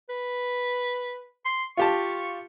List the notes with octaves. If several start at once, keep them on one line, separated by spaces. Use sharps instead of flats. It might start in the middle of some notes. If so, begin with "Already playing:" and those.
B4
C6
F4 G4 A5 C#6